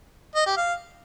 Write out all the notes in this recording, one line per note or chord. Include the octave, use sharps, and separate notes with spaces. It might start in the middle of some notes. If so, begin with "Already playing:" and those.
D#5
G4
F5